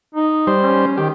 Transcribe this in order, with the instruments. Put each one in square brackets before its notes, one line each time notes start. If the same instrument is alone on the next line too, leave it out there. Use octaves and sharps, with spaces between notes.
[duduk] D#4
[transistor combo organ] G3 C5
[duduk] C#4
[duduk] D#3 [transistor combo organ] G4